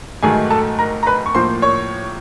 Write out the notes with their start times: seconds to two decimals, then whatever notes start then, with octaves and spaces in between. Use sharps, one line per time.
0.23 G#2 D#3 F#3 A3 G#4 G#5
0.51 A4 A5
0.79 A#4 A#5
1.03 A#5
1.06 B4 B5
1.26 C#6
1.34 A2 F3 A#3 C5 C6
1.62 C#5 C#6